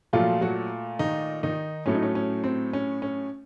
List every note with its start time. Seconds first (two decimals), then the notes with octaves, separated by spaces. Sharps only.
0.13 A#2 F3 F#3 A3 F4
0.41 F#3 F#4
0.99 D#3 D#4
1.43 D#3 D#4
1.86 A2 F#3 A3 C#4
1.95 D#4
2.02 C#4
2.15 C#4
2.44 C4
2.73 C#4
3.02 C#4